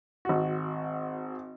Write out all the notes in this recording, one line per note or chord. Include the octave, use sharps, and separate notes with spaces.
G#1 F#4